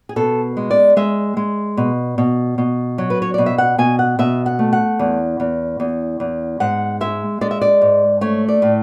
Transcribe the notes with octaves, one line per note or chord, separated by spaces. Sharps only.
G#4
B2 A4
G#3
D5
G#3 E5
G#3
B2
B2
B2
F#3
B4
C#5
B2 D5
E5
F#5
B2 G#5
F#5
B2 E5
F#5
A3
F#5
E2
E2
E2
E2
G#2 F#5
G#3 E5
G#3 D5
E5
D5
G#2
A3 C#5
D5
A2